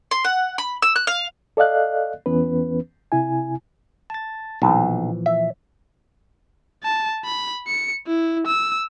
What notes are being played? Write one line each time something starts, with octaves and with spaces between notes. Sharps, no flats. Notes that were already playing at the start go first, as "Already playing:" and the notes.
C6
F#5
B5
E6
F#6
F5
A4 D5 D#5 F5 F#6
E2 E3 B3 C#4 B4
C3 E4 G#5
A5 A6
B1 A#2 E3 F3
E5
A5
B5
C#7
E4
E6